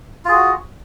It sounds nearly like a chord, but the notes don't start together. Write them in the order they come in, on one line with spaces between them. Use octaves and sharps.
F4 G#4 F#4